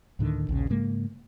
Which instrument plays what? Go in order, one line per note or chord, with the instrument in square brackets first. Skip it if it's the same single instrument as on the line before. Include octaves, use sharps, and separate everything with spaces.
[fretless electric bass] D2 A2 D3 D#3
A#1 D#2 C#3
G#2 C#3 G#3 A#3